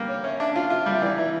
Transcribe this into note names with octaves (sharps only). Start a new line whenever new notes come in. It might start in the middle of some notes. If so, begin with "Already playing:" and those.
Already playing: G3 A#3
C#5
C#4 E5
D4 E5
F4 F5
F4 E5
G3
E5
E3 D5
E3 E5